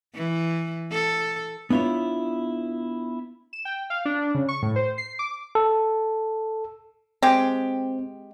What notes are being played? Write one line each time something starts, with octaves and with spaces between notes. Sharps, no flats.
E3
A4
B3 D4 E4 F4 C#5
E7
G5
F5
D4
C#3
C#6
A2
C5
C7
D6
A4
G#3 C4 G4